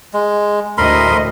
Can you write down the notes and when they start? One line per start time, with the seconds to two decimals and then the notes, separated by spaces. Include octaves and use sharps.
0.14 G#3
0.78 D2 A2 A#4 D#5 B5 C6